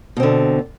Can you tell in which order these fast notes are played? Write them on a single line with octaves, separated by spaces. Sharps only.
B2 C4 D3